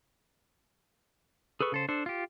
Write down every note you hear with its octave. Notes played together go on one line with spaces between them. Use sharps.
G#4 A4 B4 C#6
C#3 A4 C5
D4 A4 C5
F4 G4